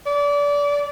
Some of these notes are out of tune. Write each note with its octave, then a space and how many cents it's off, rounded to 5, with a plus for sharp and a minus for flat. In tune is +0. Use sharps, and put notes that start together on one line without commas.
D5 -30